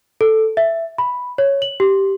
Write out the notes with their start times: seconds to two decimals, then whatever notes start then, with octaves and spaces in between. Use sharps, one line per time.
0.21 A4
0.57 E5
0.98 B5
1.38 C#5
1.62 F#7
1.80 G4